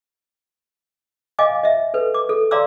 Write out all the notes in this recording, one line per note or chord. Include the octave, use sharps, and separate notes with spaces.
D#5 F5 G#5 D6
D#5 E5
A4 B4
D6
A4
D5 F5 A#5 C6 D6 E6